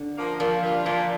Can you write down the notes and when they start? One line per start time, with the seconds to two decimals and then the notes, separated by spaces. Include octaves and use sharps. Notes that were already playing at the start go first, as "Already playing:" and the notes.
Already playing: D3
0.17 F3 A#3
0.39 A#2 F3
0.63 G3 D4 F4
0.86 A#2 F3